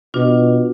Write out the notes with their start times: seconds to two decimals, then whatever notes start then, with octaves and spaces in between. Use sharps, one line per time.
0.14 B2 D4 F4